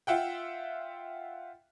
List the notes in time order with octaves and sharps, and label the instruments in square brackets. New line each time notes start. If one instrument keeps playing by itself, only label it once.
[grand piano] F4 E5 F#5 G5